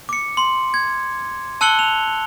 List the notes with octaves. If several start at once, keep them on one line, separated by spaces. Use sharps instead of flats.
D6 C#7
C6
G#6
A5 E6 F#6 C#7 F#7 G7
F7